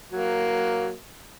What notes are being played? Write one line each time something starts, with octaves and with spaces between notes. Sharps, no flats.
F#3 A#3